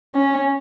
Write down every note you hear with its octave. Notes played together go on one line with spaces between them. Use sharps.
C#4